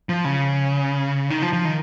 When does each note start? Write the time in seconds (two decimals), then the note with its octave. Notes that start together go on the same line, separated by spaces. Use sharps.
0.09 F3
0.25 C#3
1.30 D#3
1.42 F3
1.53 F3
1.65 D#3